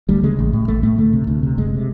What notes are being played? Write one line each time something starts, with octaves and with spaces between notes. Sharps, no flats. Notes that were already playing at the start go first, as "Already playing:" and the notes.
D2 G3
C#3 G#3
A1
A2
A1 A3
A2 A3
D2 A3
C3
D2
C3
F#1 G#3
C3